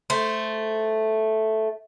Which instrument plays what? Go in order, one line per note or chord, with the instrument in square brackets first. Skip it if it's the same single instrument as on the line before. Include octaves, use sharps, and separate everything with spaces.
[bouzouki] A3 C5